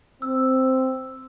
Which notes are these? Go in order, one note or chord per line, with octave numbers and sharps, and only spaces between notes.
C4 E6